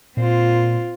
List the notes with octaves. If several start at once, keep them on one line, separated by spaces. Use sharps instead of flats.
A#2 C4 F4